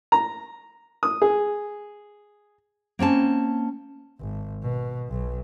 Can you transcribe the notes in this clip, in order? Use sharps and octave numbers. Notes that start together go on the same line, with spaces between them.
A#5
D#6
G#4
A#3 C4 C#4 A5
G#1
B2
B1